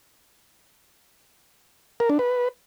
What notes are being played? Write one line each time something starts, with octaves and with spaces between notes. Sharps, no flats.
A#4
D4
B4